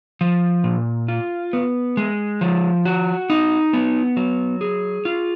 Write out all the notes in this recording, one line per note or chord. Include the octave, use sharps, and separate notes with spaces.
F3
A#2
F4
B3
G#3
F3
F#4
D#4
B3
F#3
G#4
F4